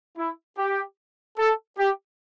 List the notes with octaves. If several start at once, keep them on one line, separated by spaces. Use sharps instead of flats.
E4
G4
A4
G4